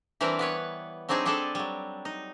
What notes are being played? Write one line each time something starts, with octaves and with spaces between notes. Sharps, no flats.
E3 G3 C4 D4 A#4 B4
B3 B4 C#5
F#3 C4 D4 D#4 G#4
G3 D4 G#4 A4
F#3 G3
D#4